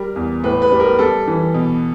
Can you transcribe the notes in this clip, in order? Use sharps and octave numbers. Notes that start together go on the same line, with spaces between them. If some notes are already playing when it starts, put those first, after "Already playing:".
Already playing: G3 A#4
E2
A2 B4
B4
G3
A#4
G3 A4
E3
B2